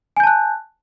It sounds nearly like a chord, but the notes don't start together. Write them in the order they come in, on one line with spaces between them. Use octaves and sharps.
G#5 G6 A5 F#6